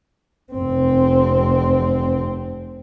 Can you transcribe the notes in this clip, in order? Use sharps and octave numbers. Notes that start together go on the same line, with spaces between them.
F1 C4